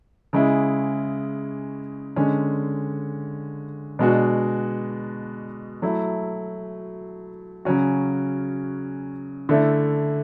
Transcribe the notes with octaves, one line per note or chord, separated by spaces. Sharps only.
C#3 G#3 C#4 E4
D3 G#3 C#4
B2 G#3 D4 F#4
F#3 A3 E4
C#3 F#3 C#4 F#4
D3 A3 E4